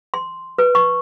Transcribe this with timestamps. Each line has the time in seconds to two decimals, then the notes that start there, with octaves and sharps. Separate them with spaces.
0.14 C6
0.58 B4
0.75 C#6